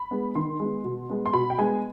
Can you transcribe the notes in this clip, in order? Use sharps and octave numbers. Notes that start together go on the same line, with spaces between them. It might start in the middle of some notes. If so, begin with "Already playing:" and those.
Already playing: B5
G#3 B3
D#3 C6
G#3 B3
B2
G#3 B3
C6
B2 B5
G5
G#3 B3 G#5